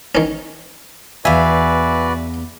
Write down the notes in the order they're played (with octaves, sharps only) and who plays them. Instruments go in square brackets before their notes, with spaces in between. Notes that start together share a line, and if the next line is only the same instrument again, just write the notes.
[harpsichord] D#3 C#4
[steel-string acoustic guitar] E2 F5 [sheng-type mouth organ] F#4 B4 D5 [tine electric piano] E5 G#5